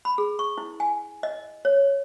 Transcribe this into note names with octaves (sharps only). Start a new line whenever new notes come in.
B5
G#4
C#6
E4
G#5
D#5
C#5